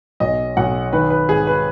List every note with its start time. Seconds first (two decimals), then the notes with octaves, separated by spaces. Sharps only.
0.20 B1 D#5
0.57 B1 F#5
0.93 D#3 B4
1.10 B4
1.29 G#1 G#4
1.47 B4